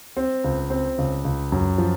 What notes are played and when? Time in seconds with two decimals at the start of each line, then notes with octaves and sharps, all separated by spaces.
0.17 C4
0.44 C#2
0.70 C4
0.98 C#2
1.24 C#2
1.52 F#2
1.78 F3